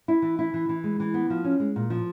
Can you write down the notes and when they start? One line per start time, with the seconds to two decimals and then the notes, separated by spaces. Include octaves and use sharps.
0.08 E4
0.22 E3
0.39 E4
0.54 E3
0.69 E3
0.84 G#3
1.00 E3
1.14 B3
1.30 F3
1.44 C#4
1.60 G#3
1.76 A#2
1.90 F3